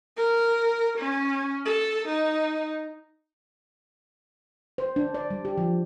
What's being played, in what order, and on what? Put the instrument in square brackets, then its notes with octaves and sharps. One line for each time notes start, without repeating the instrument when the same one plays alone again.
[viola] A#4
C#4
A4
D#4
[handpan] C5
D4
D5
G3
G4
F3